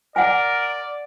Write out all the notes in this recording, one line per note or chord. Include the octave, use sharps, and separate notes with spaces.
A#4 D5 F#5 G#5